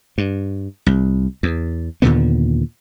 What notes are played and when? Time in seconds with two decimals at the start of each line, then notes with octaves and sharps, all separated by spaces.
0.18 G2
0.86 C2
1.43 E2
2.02 D#2 A#2 D3 B3